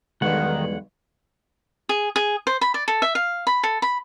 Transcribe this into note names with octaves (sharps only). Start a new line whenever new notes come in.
B1 E2 G2 D3 D#3 G#3 F#5
G#4
G#4
C5
B5
D5
A4
E5
F5
B5
A4
B5